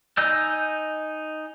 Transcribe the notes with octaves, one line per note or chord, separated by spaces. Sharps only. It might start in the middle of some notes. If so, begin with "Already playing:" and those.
D#4 D#5 G#5 E6 G6